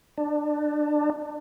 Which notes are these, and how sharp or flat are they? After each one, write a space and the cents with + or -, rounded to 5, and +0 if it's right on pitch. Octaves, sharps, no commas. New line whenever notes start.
D4 +20